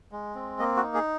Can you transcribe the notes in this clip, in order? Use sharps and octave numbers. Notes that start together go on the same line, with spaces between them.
G#3
C4
A#3 D#5
F#4
D#4
G#4